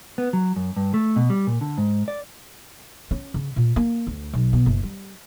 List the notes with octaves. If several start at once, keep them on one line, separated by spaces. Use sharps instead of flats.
B3
F#3
F#2
G2
A3
B2
G3
A#2
D3
G#2
D5
C#4
C#3
A#2
A#3
D2
B1
B2
F#1
G3